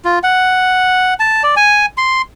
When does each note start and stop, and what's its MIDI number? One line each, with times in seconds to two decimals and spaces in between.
0.05 0.19 65
0.23 1.14 78
1.20 1.43 81
1.43 1.55 74
1.56 1.86 80
1.97 2.22 84